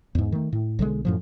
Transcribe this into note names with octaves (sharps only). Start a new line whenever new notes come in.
E2 G#2
D#3 A3
A2
B1 D3 F3 G#3
F#2 A2 F3